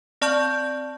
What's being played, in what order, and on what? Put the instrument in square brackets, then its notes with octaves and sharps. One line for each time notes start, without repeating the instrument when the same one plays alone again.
[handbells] C4 D5 A5 C#6 F6 G6